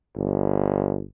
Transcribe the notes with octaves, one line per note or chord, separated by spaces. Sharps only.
G1